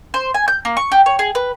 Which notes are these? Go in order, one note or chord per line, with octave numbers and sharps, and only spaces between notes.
C5
G#5
G6
A#3
C#6
G4
C#5
G#4
B4